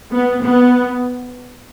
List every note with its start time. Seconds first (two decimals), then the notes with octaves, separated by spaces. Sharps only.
0.11 B3
0.42 B3